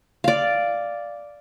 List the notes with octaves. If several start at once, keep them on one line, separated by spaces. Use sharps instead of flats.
D5 F5